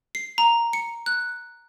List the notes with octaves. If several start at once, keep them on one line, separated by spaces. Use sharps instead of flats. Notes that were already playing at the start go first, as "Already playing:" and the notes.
C7
A#5
C#7
F#6